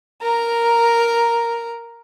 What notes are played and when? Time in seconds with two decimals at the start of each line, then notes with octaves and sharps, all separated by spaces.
0.22 A#4 A#5